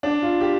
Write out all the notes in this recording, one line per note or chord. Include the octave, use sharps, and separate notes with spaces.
D4
F4
G4